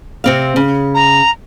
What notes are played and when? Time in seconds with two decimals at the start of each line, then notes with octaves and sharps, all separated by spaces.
0.24 C3 C4 F5
0.56 C#3
0.95 A#5